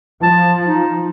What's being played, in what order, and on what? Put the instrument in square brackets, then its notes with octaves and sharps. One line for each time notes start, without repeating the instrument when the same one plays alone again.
[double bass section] F3 [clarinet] A5
[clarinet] D#4